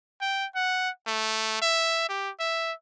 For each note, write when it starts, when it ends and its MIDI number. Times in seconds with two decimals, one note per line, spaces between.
0.22 0.46 79
0.56 0.89 78
1.07 1.57 57
1.62 2.07 76
2.09 2.30 67
2.40 2.73 76